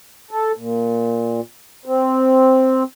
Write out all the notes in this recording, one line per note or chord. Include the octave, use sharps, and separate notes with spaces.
A4
A#2
C4